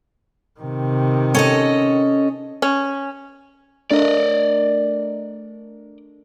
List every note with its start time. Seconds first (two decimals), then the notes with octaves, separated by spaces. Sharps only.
0.60 C3 D#3
1.35 C#4 A4 D#5
2.62 C#4
3.91 A3 D4 A#4 D5 D#5